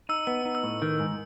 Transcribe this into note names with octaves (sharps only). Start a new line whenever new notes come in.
D#4 E6
B3 E6
D#4
E6
A2
D#3
G#2